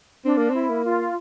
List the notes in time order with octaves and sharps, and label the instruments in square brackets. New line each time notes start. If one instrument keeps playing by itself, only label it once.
[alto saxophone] C4 [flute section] D4
[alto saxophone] A#3
[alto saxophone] C4 [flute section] E4
[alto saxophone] A#3
[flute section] F4